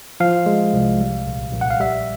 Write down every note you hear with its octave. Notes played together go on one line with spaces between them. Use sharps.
F3 F5
G#3
C2
G3
A#1
A#1
F#5
F5
G3 E5